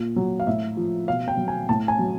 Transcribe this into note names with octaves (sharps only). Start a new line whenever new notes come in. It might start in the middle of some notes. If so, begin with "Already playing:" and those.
Already playing: A#2
F#3
F5
A2 E5
F3
B2 F5
G5
F#3
G#5
A2 A5
G#5
F#3